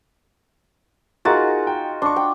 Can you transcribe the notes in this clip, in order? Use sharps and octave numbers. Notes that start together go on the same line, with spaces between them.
D#4 F4 F#4 G#4 A#4 A6
G5
D4 C6 C#6
G5